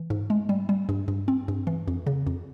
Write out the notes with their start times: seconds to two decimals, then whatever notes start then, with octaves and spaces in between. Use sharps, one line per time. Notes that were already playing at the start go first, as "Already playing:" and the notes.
Already playing: E3
0.10 G#2
0.30 G#3
0.49 G3
0.69 G3
0.89 G2
1.08 G2
1.28 C4
1.48 G2
1.67 E3
1.88 F2
2.07 C#3
2.27 F2